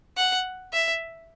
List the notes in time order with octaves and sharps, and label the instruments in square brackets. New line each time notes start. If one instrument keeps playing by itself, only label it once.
[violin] F#5
E5